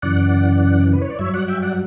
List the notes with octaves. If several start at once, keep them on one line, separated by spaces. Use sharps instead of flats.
F#2 C#3 E3 D5 F#5
B4
C#5
D5
G2 F#3 C#5 E5
D5 F#5
E5 G5
D5 F#5